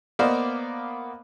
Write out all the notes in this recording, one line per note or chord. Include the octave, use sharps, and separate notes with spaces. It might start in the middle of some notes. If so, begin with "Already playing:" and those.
A#3 B3 C5 D5 D#5 F5